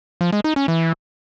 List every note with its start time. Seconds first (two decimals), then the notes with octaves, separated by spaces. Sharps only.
0.21 F3
0.33 G#3
0.44 D#4
0.56 C#4
0.68 E3